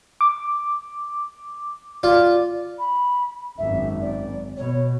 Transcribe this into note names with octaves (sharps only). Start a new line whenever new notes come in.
D6
F4 D5
B5
G#1 F#2 E5
D5
B2 C#5